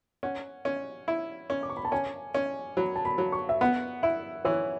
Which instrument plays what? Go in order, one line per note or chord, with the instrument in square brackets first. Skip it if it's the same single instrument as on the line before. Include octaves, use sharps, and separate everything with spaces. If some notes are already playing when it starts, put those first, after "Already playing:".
[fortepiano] C#4 [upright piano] F#5
[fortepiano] C#4
E4
C#4
[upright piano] D6
C#6
B5
A5
[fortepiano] C#4 [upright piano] G#5
[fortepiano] C#4
[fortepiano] F#3 [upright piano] B5
[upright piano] A5
B5
[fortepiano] F#3
[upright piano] C#6
E5
[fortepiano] B3 [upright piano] F#5
[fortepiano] E4 [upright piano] E5
[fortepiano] E3 [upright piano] C#5